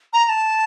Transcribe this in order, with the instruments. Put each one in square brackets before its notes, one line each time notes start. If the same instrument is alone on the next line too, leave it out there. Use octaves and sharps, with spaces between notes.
[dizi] A#5
A#5
A5